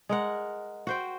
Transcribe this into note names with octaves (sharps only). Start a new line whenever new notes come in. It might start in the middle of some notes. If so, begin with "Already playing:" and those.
G#3 A#4 F#5
F#4 C5 G5